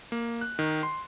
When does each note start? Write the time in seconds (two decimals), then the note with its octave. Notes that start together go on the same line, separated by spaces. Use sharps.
0.12 A#3
0.41 F#6
0.59 D#3
0.83 C6